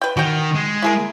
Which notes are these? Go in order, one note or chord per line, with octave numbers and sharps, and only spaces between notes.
B4 G5
D#3 F#4 G5
G#3
E4 G#4 A#4